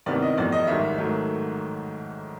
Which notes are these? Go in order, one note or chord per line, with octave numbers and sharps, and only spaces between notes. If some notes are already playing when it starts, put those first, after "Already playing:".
C2 C3 D#3 G3 B3 D5
D#5
F1 E2 B2 D5
D#5
A1 G#2 D#3 G3 E5
G#2 D#3 F#3 A3